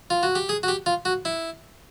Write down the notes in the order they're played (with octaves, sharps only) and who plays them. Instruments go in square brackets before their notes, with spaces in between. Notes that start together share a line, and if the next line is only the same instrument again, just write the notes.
[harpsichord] F4
F#4
G4
G#4
F#4
G4
F4
F#4
E4